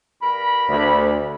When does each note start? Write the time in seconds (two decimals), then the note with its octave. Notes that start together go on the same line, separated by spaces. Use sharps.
0.22 G2 A#4 B5
0.69 D2